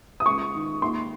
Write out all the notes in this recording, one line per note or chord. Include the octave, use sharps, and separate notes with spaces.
D#6
C#2 C#6
D#3
D#2 C6